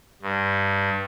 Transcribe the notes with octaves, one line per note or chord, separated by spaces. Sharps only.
G2